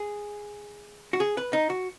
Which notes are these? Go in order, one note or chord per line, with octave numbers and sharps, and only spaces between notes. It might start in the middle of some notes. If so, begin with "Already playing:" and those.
Already playing: G#4
F#4
G#4
B4
D#4
F#4